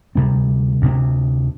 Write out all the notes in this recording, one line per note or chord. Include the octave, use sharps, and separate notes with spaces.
D2 C3 G3 C4
D2 C3 G3 C4